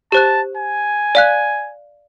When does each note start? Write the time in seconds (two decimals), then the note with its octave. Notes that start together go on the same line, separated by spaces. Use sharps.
0.12 G4 C5 A5 F#6
0.57 G#5
1.15 D5 F5 F#6